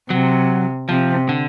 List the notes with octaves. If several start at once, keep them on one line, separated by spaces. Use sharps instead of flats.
C3 F#3
C3 F3
D3